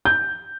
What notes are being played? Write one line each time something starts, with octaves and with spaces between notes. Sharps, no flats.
G6